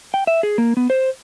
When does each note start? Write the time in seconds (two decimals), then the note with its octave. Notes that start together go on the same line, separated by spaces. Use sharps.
0.14 G5
0.27 E5
0.43 G#4
0.58 A#3
0.77 B3
0.90 C5